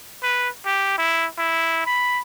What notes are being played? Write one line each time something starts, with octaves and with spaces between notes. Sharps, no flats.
B4
G4
E4
E4
B5